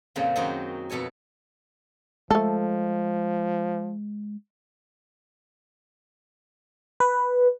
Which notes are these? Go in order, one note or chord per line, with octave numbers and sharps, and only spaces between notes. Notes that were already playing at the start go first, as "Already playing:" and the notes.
F2 A#2 C#3 F3 A#3 C4
F#2 D#3 F#3 C4 D#4 F#4
F2 B2 A4 C#5 G#5
F3 G#3 A3 A4
B4